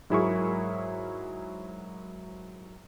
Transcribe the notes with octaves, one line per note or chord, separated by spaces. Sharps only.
G#2 F#3 E4 G#4 A#4 C#6